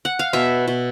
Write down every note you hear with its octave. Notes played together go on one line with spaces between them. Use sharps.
F#5
F5
B2 E5
B2